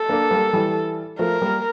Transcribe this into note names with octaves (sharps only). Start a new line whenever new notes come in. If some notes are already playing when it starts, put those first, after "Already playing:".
Already playing: A4
A#3 D4
G3 A#3
E3 G3
F3 A3 A#4
G3 A#3